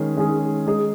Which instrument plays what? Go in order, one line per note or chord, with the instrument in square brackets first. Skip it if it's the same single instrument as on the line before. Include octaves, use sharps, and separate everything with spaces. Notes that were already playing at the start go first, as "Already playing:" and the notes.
Already playing: [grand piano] D#3 G#3 C#4 G#4
D#3 G#3 C#4 G#4
G#3 D#4 G#4